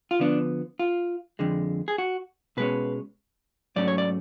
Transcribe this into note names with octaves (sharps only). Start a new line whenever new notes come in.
F4
D3 F3 B3 D4
F4
F2 D3 G#3
G#4
F#4
B2 G#3 C#4 B4
G#2 F#3 A3 C#4 D5
C#5
D5